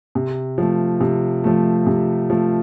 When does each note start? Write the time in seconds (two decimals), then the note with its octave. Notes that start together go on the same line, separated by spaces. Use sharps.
0.15 C3
0.58 F3 A3
1.01 C3
1.44 F3 A3
1.87 C3
2.30 F3 A3